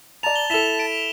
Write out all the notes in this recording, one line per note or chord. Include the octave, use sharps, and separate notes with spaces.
D5 A5 A#5 F7
G7
E4 A4 B6 E7 G7
D7